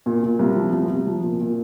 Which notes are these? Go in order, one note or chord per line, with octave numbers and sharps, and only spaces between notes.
A#2
A#2
C2
F3
C2
C2
F3
A#2
A#2